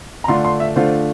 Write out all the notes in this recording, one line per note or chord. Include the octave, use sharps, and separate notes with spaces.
A#5
D3 A3 D4 F4 C6
C6
E5
D3 A3 D4 F4 C5